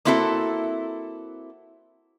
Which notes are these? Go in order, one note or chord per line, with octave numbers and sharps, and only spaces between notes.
A#3 C4 E4 F#4 A4 E5